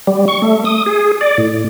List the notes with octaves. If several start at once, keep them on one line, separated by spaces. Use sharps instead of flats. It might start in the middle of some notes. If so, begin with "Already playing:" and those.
G3
C#6
A3
D#6
G#4
D5
A2